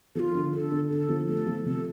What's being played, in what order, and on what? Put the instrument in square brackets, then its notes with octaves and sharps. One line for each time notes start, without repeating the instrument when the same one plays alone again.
[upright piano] F3 [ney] F4 A4
[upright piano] D3
[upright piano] D3 [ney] A4
[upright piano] D3
[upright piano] D3 [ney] A4
[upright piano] F3
[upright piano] A3 [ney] A4
[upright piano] F3
[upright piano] C3 [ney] A4